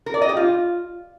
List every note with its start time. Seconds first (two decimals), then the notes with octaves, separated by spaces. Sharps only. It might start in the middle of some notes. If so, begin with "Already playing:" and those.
0.06 A#4
0.14 D5
0.22 D#5
0.29 G4
0.37 F4